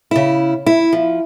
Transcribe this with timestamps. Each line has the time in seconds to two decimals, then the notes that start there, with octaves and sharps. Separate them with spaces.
0.11 C#3 E4
0.66 E4
0.93 F3